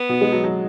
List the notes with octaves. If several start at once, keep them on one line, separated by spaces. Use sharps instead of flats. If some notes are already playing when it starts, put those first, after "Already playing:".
Already playing: B3
B2
G#3
F#3
F#3